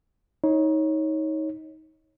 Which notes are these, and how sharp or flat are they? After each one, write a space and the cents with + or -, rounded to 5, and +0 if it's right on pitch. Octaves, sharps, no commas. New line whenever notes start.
D#4 +25 C#5 -10